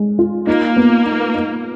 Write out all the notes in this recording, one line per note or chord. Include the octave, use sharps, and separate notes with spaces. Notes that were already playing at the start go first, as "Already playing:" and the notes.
Already playing: G#3
F4
A#3 D#4
B3
D#4
D#4